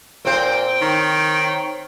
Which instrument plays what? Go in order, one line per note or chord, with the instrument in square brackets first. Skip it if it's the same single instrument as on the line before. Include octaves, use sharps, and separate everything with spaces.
[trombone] A#2 [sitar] C4 C5 [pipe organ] G5
[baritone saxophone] D#3 [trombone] C#5